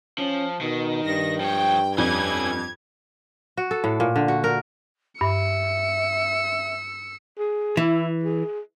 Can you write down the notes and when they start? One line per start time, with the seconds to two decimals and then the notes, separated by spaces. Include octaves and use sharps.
0.18 F3 C#4
0.61 B2 D#3
1.05 G2 A#6
1.40 F3 C#5 G5
1.98 F2 C#4 B4 G#6
3.57 F#4
3.71 A4
3.84 A2
4.00 A#2
4.16 D3
4.28 F#4
4.44 A#4
5.21 G2 E5 E6 C#7
7.39 G#4
7.77 E3 E4
8.24 G#4